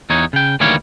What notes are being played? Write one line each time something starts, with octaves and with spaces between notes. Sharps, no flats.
E2 D#4 C#5
C#3 G5
D2 D#3 E3 G3 A#3 C#5